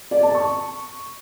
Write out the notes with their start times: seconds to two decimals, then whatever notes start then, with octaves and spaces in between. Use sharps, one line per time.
0.11 D5
0.23 A5
0.35 C#6